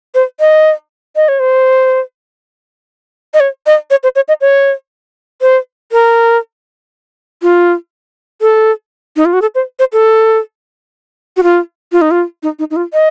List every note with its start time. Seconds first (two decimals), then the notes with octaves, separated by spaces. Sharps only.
0.15 C5
0.40 D#5
1.16 D#5
1.28 C#5
1.40 C5
3.34 D#5
3.40 C#5
3.66 D#5
3.91 C#5
4.03 C5
4.16 C#5
4.28 D#5
4.41 C#5
5.42 C5
5.92 A#4
7.42 F4
8.41 A4
9.16 D#4
9.25 F4
9.33 F#4
9.42 A4
9.55 C5
9.79 C5
9.93 A4
11.37 F#4
11.43 F4
11.92 F4
12.02 D#4
12.11 F4
12.43 D#4
12.59 D#4
12.71 D#4
12.76 F4
12.93 D#5